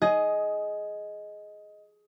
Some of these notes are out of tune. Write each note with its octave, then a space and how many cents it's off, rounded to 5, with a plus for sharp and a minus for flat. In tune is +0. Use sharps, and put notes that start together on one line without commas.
G#4 +15 D#5 +5